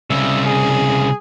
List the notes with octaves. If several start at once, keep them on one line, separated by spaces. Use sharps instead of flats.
C2 C#3 E5
G#4